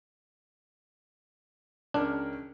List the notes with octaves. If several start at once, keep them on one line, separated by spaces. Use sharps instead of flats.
C#2 C#4 D4 A#4